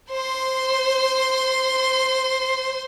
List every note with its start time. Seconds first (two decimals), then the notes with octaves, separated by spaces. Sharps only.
0.10 C5 C6